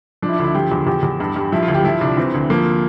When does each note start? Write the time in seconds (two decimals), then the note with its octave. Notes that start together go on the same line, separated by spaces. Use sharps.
0.22 F3 D4
0.29 E4
0.33 D4
0.39 D2 E4
0.54 F3 G4
0.72 E2
0.87 E2 G4
1.03 E2
1.20 G2
1.36 G2
1.52 F3 E4
1.62 F4
1.68 D2
1.74 G4
1.84 F3 E4
2.01 C2 D4
2.17 E3 C4
2.34 D2
2.50 F3 A#3